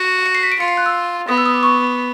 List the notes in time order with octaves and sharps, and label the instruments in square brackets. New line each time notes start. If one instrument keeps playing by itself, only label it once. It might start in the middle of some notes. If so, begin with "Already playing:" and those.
Already playing: [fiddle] F#4
[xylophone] C#7
C7
B6
D7
[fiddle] F4 [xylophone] C#7
[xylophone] C7
F#6
E6
[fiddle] B3 [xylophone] D#6
[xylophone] E6
D#6
D6
C#6